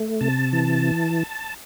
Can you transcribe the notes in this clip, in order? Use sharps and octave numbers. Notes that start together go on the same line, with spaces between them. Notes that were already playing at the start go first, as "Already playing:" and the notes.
Already playing: A3
C3 A5
E3